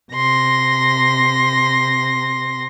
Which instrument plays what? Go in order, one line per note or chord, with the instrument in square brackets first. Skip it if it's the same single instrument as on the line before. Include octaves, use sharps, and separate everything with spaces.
[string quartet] C3 C6 A#6